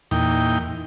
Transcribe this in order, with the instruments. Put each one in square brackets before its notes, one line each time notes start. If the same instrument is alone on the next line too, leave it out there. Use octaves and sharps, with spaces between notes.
[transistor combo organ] E2 A#2 D#4 G5